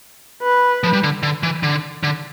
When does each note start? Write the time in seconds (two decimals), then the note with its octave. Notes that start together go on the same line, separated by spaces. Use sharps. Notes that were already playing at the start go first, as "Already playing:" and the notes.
0.42 B4
0.84 F3
0.93 G3
1.03 D3
1.23 D3
1.43 E3
1.63 D3
2.03 D3